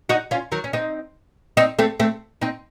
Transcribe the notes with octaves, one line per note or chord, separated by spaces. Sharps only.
D#4 F#4
C#4 F4
D#3 F#3
C#4
C4 D#4
C4 D#4
A3 C4
A3 C4
C4 D#4